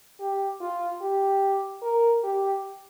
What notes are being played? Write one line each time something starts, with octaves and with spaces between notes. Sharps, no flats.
G4
F4
G4
A#4
G4